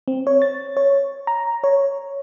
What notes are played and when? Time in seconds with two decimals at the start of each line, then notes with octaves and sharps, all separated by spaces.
0.08 C4
0.27 C#5
0.42 A6
0.77 C#5
1.27 A#5
1.64 C#5